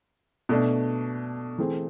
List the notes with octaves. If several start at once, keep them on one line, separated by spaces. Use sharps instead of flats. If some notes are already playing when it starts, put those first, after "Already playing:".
B2 A3 D4
E3 A3 C4 G#4 C5